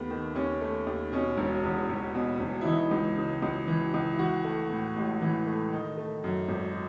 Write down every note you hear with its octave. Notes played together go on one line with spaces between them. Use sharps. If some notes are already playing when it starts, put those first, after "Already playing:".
Already playing: D#2 A3 B3
D#3
D#2 C#4
A3
D#2
B2 C#4
E1
E2
E1
B2
E1
E4
E3 D#4
C#2
C#3
C#2
E3
C#2
E4
E3 F#4
A3
A2
A1
E3
A3
D#3 D#4
A3
F#2
G#1